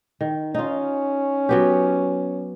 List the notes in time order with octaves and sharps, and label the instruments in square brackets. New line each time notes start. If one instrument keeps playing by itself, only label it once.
[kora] D#3
[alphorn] C#4 [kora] D#4 F4
[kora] F#3 B3 G4